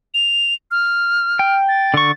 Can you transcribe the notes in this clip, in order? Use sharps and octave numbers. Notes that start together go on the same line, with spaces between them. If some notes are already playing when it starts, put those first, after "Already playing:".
F7
F6
G5
A6
D3 C#6